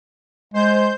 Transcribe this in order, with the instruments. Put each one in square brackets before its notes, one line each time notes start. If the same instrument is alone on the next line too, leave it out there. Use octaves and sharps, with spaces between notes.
[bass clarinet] G#3 [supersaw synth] C5 G6